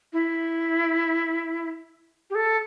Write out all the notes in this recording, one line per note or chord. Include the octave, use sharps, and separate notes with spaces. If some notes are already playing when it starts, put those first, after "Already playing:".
E4
G4
A4